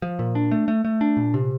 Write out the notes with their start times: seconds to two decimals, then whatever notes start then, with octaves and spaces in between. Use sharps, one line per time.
0.02 F3
0.19 A#2
0.35 D4
0.51 A3
0.68 A3
0.85 A3
1.01 D4
1.17 A#2
1.34 C3